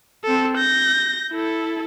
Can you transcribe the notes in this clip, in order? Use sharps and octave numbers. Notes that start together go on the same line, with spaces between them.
C4 A4
G6 A#6
E4 A4